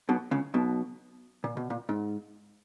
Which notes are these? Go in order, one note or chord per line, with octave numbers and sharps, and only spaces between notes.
B1 B2
C#2 C#3
B1 B2
A#2
B2
A#2
G#2